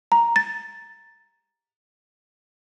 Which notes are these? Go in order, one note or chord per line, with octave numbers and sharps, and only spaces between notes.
A#5
A6